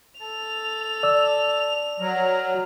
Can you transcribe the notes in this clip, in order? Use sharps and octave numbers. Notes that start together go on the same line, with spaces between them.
A4 F7
D5 E6
F#3 A#4